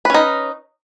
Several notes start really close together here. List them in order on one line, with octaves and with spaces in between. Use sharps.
B4 C#4 D#4